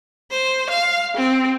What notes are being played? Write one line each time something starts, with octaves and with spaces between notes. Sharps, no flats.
C5
F5
C4